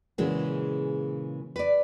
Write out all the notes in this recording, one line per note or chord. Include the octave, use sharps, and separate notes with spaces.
A#2 C#3 E3 G#3 F#4
B4 D5